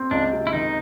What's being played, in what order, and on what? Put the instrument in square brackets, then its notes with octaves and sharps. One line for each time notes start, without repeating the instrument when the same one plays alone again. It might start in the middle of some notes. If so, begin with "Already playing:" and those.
Already playing: [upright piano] C4
[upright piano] C#2 [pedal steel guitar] D4
[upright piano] C3
[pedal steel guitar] E4
[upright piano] D#3 [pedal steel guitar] D#4